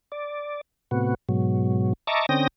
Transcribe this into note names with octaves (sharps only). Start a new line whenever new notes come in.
D5
A2 C3 B3 F#4
G#2 B2 F#3
D#5 E5 A5 A#5 C#6 D6
D3 C4 C#4 G5 D#6 A#6